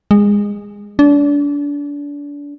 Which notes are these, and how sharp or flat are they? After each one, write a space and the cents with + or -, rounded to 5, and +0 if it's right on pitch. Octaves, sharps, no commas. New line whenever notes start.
G#3 -20
D4 -30